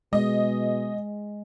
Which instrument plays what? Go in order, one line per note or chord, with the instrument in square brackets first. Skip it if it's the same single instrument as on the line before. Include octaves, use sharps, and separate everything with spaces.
[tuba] B2 [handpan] G#3 [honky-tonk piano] D#5